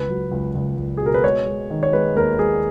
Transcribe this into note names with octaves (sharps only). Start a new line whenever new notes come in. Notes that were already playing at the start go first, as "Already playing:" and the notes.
Already playing: C#2 B4
F#3
C#2
C#2
C#2
G#4
B2 A#4
B4
G#3 C#5
G#3
D#3
C#5
G#3 B4
D#2 A#4
G#3 G#4